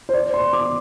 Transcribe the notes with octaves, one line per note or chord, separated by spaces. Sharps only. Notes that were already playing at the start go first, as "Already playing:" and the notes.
C5
D5
C6
D6